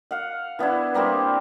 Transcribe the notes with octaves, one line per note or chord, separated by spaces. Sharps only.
F5 F#5
E3 B3 D4 E4
G3 A#3 C4 G4